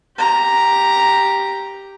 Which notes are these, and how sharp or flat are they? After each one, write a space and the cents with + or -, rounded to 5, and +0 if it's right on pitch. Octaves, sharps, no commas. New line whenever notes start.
G4 +0 A#5 +0